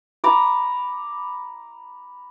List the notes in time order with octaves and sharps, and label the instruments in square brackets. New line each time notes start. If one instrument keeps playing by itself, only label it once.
[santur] A#5 B5 D6